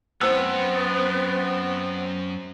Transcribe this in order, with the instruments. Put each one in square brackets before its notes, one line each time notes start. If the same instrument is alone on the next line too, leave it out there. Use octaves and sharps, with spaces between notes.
[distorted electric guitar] F#2 C#5 [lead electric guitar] B3 [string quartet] C4 [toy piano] C5 E6